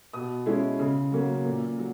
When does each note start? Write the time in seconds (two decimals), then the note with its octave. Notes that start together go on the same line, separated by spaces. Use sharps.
0.13 B2 D#6
0.46 G#3 C#4 E4
0.79 C#3
1.12 F#3 A#3 C#4
1.45 A#2
1.78 F#3